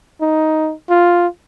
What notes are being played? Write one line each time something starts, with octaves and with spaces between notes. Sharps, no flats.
D#4
F4